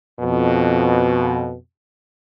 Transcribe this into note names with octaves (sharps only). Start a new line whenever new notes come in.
F2 B2